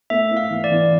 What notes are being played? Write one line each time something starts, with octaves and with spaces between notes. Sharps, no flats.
A3 E5
E4
F5
E3
D5
E3